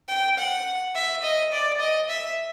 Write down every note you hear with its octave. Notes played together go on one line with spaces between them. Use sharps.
G5
F#5
E5
D#5
D5
D#5
E5